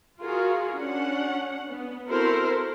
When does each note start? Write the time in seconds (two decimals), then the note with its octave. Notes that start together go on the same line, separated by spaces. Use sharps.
0.19 F4 F#4 G#4 A#4
0.76 C#4 D4 F#5
1.69 B3
2.09 C4 E4 F#4 A4 A#4 C5